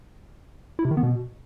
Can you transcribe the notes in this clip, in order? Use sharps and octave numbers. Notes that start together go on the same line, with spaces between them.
E4
C3
D#3
B3
B2